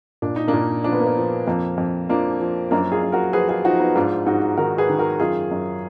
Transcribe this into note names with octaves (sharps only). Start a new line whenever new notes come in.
A#2 D4
D#4
A#3 D4
A#2
F3 D4
B3
A#3
B3
F3
F2 A#3
F2
F3 A#3 D4
F3
F#2 A#3 D4
F4 G#4
F#2
F#4 A#4
F3 G#4 B4
F4 G#4
F3 D#4 F#4
B3 D#4
G#2 D4 F4
G#2 D#4 F#4
D#3 F#4 A#4
G#4 B4
D#3
F#4 A#4
F#2 F4 G#4
F#2